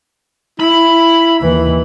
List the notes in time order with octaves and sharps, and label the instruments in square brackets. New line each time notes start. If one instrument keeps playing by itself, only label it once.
[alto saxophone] E4 [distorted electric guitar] B5
[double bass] D#2 E3